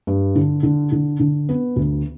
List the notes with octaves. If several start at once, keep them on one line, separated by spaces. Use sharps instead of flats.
G2
D3
D3
D3
D3
B3
D2